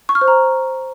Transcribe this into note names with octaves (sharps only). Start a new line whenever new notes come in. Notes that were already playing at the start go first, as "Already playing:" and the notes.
C#6
F6
C5
A#5